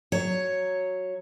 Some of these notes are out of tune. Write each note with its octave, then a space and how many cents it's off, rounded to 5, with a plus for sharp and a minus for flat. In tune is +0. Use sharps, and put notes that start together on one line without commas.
F#3 +0 C#5 +0